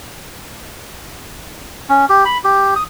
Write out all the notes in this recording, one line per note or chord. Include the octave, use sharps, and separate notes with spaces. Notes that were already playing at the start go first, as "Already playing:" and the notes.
C#4
G4
B5
G4
D#6